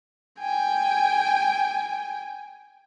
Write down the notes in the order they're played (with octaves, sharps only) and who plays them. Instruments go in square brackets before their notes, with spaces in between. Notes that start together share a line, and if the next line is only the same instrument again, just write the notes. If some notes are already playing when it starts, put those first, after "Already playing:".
[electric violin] G5 G#5